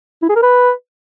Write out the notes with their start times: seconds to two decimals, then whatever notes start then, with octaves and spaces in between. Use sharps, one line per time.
0.22 E4
0.29 G#4
0.36 A#4
0.42 B4